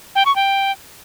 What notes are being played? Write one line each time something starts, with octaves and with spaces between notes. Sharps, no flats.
G5
C#6
G5